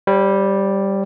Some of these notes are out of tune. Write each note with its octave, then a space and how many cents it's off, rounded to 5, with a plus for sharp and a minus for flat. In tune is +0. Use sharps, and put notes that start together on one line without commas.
G3 +0 C#5 -45